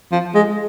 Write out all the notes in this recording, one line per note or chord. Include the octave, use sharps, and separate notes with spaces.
F3
G#3